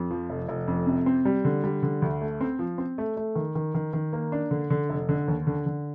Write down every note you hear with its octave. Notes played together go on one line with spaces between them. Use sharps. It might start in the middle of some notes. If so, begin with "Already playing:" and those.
Already playing: F2
F3
F1
F1
F2
C3
C4
G3
D3
G3
D3
D2
A3
C4
F3
C4
A3
A3
D#3
D#3
D#3
D#3
A#3
D4
D3
D3
F1
D3
D#2
D3
D3